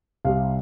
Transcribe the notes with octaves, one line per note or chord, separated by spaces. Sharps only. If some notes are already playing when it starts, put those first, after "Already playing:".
C2 C3 G3 F5